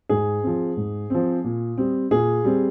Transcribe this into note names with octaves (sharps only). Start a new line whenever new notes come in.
G#2 G#4
F3 C4
G#2
F3 C4
A#2
G3 C4
A#2 G#4
G3 C4